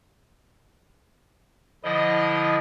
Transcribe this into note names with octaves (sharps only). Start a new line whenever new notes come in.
D3 F3 E4 D#5